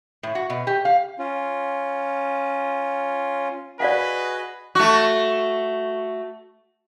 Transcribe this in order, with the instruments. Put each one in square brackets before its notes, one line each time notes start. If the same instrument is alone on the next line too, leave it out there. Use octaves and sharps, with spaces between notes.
[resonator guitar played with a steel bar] A2
F#4
B2
G4
F5
[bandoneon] C#4 F4
[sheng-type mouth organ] F#4 G#4 D#5 [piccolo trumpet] B4 [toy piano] D5 F5 F#5
[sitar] A3 F#4